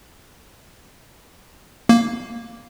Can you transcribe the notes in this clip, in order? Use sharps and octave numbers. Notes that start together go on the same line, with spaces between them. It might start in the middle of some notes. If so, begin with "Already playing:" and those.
A#3